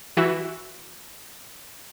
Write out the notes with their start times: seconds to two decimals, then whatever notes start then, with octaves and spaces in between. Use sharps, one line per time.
0.17 E3 E4 F#4